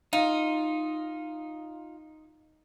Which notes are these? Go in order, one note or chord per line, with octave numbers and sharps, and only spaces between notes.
D#4 F4